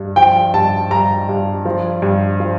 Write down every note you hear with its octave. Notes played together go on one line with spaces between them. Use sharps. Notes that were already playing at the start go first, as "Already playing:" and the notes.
Already playing: G2
F3 G5
G2 A5
G2 A#5
G2
F3
G2
F3